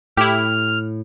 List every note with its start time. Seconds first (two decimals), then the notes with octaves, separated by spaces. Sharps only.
0.17 A2 E4 G4 F6